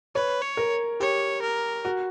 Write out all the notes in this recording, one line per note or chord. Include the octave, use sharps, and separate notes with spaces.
B4 C#5
C#5
A#4
G4 C#5
A#4
F#4